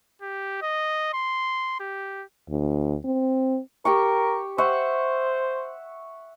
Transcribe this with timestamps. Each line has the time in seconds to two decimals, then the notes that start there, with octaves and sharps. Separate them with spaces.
0.22 G4
0.62 D#5
1.13 C6
1.80 G4
2.50 D2
3.05 C4
3.85 G4 A#4 G5 C#6
4.58 C5 E5 F#5 C#6